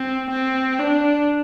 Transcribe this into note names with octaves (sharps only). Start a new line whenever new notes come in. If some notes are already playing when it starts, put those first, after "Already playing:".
Already playing: C4
C4
D4